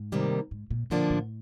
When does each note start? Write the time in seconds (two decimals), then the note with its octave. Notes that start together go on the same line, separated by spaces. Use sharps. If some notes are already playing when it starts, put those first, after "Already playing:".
Already playing: G#2
0.12 C3 D#3 G3 A#3
0.51 G#2
0.70 A#2
0.90 A#2 D3 F3 A#3 D4
1.10 A2